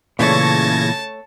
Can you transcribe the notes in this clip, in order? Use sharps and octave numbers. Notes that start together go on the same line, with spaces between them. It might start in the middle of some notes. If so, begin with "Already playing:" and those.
A#2 C#3 E3 A3 C#5 A5 G#6 A#6